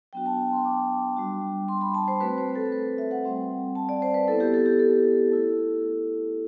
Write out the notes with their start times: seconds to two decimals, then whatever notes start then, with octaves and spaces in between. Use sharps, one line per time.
0.13 F#3 B3 D4 F#4 G5
0.26 A5
0.52 C6
0.65 D6
1.17 G3 D4 F#4
1.68 C6
1.81 B5
1.94 A5
2.08 C5
2.20 A3 C4 F#4 B4
2.38 C5
2.55 A4
2.72 B4
2.98 E5
3.11 F#5
3.24 G3 C4 F#4
3.75 A5
3.89 D5
4.02 C5
4.14 B4
4.28 B3 E4 A4
4.40 G4
4.54 A4
4.66 G4
4.79 A4
5.31 A3 E4